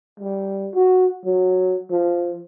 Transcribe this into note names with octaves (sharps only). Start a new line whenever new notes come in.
G3
F#4
F#3
F3